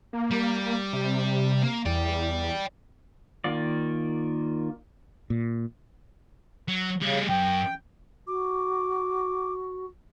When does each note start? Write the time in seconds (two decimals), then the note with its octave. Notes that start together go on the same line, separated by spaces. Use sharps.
0.13 A#3
0.31 G3
0.93 C3
1.63 A#3
1.86 E2 D5 G5
3.44 D#3 A#3 F4 D5
5.30 A#2
6.68 F#3
7.01 C#3 G3 G#4
7.29 F#2 G5
8.27 F#4 D6